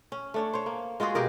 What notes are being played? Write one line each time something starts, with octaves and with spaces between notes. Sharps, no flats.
C#4
A3 D4 C#5
C5 C#5
A#3
G#3 F4 F#4 G#4
B2 G4 G#4 A#4